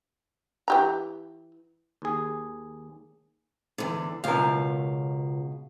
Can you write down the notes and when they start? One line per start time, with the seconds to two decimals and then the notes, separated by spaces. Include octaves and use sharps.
0.68 E3 G4 A#5
2.02 D#2 G#4
3.78 E2 D3
4.24 C#2 B2 A#4 F5